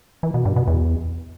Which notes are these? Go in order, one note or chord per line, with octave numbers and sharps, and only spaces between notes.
E3
B2
G2
B2
E2